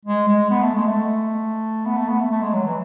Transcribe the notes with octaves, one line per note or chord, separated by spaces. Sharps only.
G#3
G#3
B3
A3
G#3
A3
B3
A3
B3
A3
A3
G#3
F#3
E3